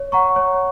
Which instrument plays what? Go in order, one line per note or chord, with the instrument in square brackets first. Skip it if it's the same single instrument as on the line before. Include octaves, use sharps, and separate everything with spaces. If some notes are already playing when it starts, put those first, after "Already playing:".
Already playing: [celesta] C#5
F#5 A#5 C#6
C#5